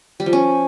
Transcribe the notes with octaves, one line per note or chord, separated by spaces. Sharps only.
G3
F3
C#4